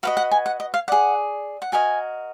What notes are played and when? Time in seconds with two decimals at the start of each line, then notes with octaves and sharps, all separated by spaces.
0.03 F#4 B4 D#5 F5
0.17 F#5
0.31 G#5
0.46 F#5
0.60 D#5
0.74 F5
0.88 G#4 D5 F#5
1.62 F#5
1.72 F#4 A#4 D#5 G#5